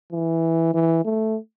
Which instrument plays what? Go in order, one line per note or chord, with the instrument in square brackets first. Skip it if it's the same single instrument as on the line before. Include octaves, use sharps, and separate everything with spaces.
[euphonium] E3
E3
A3